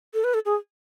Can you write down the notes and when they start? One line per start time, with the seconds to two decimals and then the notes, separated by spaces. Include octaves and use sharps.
0.14 A4
0.24 B4
0.34 A4
0.45 G#4